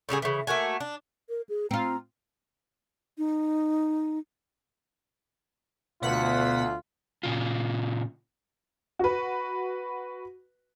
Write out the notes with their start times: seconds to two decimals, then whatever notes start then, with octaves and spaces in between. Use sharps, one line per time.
0.09 A2 C#3 G3 G#4
0.22 C#3 E3
0.47 A3 A#3 F#4 G#5
0.80 D4
1.29 A#4
1.49 G#4
1.71 C4 F4 A#5
3.18 D#4
6.02 D2 B2 F4 F#5 B6
7.23 A#2 C#3 F4
8.99 F#4 B4